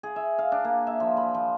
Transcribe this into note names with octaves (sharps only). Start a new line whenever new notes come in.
G#4
E5
F5
D4
A#3
E5
F3
B5
F3